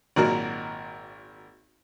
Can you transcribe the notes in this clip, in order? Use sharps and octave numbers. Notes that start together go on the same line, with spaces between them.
G#1 A#2 F#3 F#4 A#4